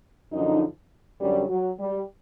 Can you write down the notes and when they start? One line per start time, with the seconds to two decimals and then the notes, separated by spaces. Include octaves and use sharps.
0.32 F#2 D3 F3 D#4
1.21 F#2 D3 F#3 G3
1.49 F#3
1.80 G3